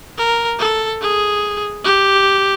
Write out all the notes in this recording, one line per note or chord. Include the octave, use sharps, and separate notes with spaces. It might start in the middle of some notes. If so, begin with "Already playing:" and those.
A#4
A4
G#4
G4